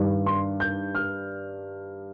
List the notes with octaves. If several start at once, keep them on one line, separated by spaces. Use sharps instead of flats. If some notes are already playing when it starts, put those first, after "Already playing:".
Already playing: G2 D#3 G3 D4
C6
G6
F6